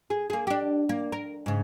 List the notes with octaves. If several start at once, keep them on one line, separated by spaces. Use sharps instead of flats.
G#4
A#3 G#4
D4 G4
A#3
A#4
G#2 C#3